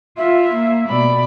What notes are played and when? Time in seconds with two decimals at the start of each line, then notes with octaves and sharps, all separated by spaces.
0.17 F4 E5
0.53 A#3
0.88 B2 D5 B5